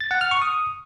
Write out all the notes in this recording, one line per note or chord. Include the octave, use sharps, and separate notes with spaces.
A6
F#5
F6
C#6
D#6